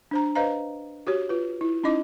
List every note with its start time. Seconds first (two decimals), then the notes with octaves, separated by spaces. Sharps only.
0.11 D4 C5 A#5
0.35 B4 C5 D#5 F5 A#5
1.07 F#4 G4 C#5
1.29 F4 B4
1.61 E4
1.84 C#4 D#4 E4 D#5 D6